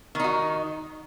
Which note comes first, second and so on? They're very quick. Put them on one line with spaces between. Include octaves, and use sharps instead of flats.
D#3 D#4 F#4